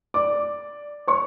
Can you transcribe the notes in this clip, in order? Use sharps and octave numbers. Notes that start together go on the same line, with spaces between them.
D5 D6
C#5 C#6